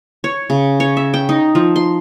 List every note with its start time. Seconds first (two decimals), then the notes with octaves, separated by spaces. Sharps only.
0.24 C#5
0.50 C#3
0.80 C#5
0.97 E5
1.14 G5
1.29 D#4
1.55 F3
1.76 C6